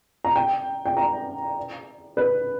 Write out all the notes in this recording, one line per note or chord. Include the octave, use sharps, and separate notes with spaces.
A#5
G5
G5
A#5
B4